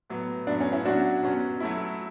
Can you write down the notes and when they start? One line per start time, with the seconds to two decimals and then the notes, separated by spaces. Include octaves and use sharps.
0.10 A2 F#3 B3
0.47 A2 F#3 B3 D4
0.60 C#4
0.72 C#4 E4
0.85 B2 F#3 C#4 D4 F#4
1.23 B2 F#3 C#4
1.60 F#3 A3 E4